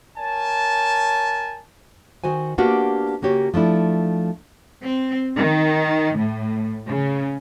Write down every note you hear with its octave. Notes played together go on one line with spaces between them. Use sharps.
A#4 C#5 G#5 A5
D#3 F#4 C5 G#5
A#3 B3 D4 F#4 G4 A#4
C#3 A#3 F#4 G4 C#5
F3 A3 D4 E4
C4
D#3
A2
C#3